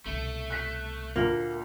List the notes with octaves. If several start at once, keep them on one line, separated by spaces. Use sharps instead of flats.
C2 B2 A3
F#6 B6
D2 A#2 A#3